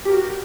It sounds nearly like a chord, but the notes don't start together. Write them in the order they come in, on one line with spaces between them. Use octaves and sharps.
G4 A#4 F#4